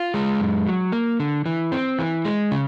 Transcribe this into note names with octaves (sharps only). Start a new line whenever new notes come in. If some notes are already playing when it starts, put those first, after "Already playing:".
Already playing: F4
G#3
F#2
F#3
A#3
D3
E3
C4
E3
G#3
C#3